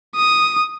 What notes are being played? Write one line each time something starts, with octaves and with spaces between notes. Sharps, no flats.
D#6